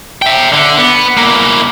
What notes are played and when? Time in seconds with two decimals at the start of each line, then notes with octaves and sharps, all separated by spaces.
0.22 E5 G5
0.53 D3
0.77 B3
1.17 A#3 E4